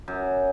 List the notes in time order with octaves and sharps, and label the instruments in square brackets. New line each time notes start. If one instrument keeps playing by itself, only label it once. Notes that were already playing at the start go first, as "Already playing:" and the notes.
[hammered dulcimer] F#2